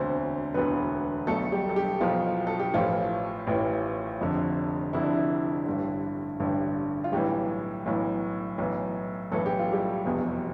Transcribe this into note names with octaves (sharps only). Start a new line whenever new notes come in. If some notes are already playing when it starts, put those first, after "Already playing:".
Already playing: E1 D2 D3 C4 C5
E1 D2 D3 B3 B4
B1 B2 A3 A4
G3 G4
A4
G3 G4
B1 B2 F3 F4
A4
G4
A1 A2 E3 F3 F4
A1 A2 E3
F1 F2 D3
F1 F2 D3 E4
D4
E4
A1 G2 D3
A1 G2 D3
F4
B1 A2 E3 G3 G4
B1 A2 E3
B1 A2 E3
B1 A2 E3 A4
G4
F4
G3 G4
F1 E2 B2